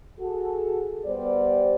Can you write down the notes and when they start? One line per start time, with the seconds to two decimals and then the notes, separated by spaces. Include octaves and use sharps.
0.19 F#4 G#4 A4
1.06 G3 B3 C5 D5